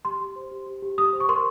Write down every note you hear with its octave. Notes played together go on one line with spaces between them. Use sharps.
G4 C6
G4
C5
G4
G4
G4
G4 D#6
C5
C#6
A#4 C6